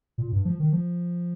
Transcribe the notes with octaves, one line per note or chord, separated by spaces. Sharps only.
A#2
G2
F3
D#3
F3